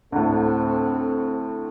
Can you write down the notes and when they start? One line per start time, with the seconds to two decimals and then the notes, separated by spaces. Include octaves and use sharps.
0.12 D2 A2 C4 A4